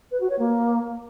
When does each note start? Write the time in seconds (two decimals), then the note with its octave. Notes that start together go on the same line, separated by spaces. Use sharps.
0.11 B4
0.20 F#4
0.29 C#5
0.39 A#3